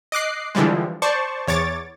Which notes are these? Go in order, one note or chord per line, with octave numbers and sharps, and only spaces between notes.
D#5 D6 F#6 C7
D3 E3 F3 G3 G#3
C5 D5 A5 C#6
E2 C#5 D6 A6